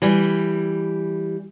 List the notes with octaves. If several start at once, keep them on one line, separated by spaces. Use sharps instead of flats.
E3 G3